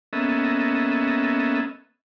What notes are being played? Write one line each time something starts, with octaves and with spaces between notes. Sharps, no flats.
A#3 B3 C#4 A4 D#5 E5